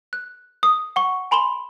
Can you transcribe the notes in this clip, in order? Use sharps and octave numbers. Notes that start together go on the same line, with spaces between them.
F#6
D#6
F#5 C#6
G#5 B5 C6 E7 G7